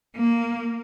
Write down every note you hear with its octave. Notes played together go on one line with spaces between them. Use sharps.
A#3